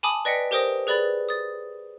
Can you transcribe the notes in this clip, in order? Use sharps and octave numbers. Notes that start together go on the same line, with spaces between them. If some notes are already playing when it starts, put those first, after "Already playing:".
G#5 A5 B5 D6 D#6
B4 D5 D#5 G5 B6 C#7
G4 A#4 C5 G5 D#6 A#6
G#4 B4 D5 B5 A6
D#6 A6